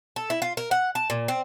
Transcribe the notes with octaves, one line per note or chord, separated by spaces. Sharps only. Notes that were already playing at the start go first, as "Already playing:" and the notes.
A4
E4
F4
A#4
F#5
A5
A#2
C4